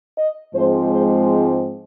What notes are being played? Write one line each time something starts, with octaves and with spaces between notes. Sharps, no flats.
D#5
G#2 F3 G#3 C4 C5
C5